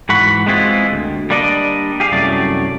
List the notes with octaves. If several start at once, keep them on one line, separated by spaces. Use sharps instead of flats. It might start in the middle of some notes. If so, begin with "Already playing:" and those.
G#2 E3 F#4 F#5 B5
G#3 B3 C4 E4 F4
D2
G3 A#3 D4 D5 D#5
G4 G#4 F5
C2 F#2 F#3 A3 D5